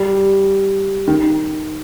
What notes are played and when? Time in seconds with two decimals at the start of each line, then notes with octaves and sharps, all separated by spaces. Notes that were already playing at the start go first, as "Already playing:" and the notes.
Already playing: G3
1.08 D#3